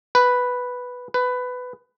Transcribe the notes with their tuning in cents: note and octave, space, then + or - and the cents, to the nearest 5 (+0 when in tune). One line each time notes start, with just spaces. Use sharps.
B4 +0
B4 +15